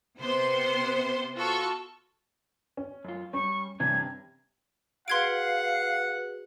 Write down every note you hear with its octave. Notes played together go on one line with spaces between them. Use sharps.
C3 B3 C5 C6
F4 F#4 A4 C#6
C#4
F#2 F4
G3 C#4 C#6
G2 C3 E3 C#4 D4 G#6
F#4 G#4 B4 F5 F#5 C6 G#6 D7